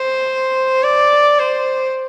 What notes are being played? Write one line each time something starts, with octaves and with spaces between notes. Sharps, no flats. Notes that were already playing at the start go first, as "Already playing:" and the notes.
Already playing: C5
D5
C5